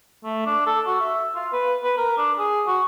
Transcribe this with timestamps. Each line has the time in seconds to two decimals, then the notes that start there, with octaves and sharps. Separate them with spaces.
0.24 A3
0.46 D4
0.67 A4
0.87 F#4
1.01 E5
1.35 F4
1.53 B4
1.84 B4
1.98 A#4
2.18 D4
2.39 G#4
2.67 F#4